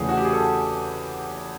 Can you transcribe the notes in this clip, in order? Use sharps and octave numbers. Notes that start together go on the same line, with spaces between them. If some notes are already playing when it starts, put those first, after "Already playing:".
Already playing: E2 C#3 E3 A3 G#4
F#4
G4
G#4
A4